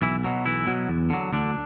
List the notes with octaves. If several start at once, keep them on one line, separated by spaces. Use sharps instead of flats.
B1 E3 E4
B2 F#3
B1 E3 E4
B2 F#3
E2
D3 F#3
D2 D3 D4